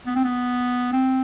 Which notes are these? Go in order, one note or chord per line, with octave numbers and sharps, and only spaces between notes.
B3
C4
B3
C4